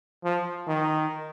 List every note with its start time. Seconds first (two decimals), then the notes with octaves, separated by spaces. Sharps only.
0.24 F3
0.67 D#3